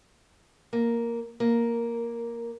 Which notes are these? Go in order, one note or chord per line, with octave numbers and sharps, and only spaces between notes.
A#3
A#3